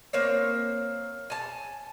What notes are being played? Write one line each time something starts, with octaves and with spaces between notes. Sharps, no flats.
A#3 C4 C#5
G#5 A5